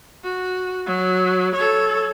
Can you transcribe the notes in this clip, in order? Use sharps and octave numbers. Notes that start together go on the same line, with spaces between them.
F#4
F#3
A4 C#5